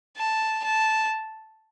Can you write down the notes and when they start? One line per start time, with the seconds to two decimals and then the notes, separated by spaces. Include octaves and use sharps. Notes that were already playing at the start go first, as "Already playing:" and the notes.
0.17 A5
0.64 A5